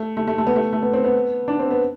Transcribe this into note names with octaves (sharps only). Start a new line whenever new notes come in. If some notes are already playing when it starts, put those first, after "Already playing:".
Already playing: A3
A3
A3
A3
B3
A3
A3
B3
C4
B3
D4
C4
B3